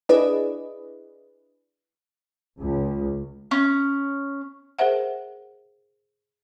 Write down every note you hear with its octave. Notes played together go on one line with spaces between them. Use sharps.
D4 E4 G#4 B4 D5 D#5
C#2
C#4
G#4 A#4 C5 E5 F#5